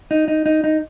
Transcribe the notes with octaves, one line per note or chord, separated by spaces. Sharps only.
D#4
D#4
D#4
D#4